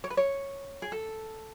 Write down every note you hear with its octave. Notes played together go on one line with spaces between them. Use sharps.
C#5
B4
C#5
G#4
A4